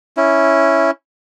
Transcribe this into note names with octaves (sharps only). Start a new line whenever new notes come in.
C#4 E4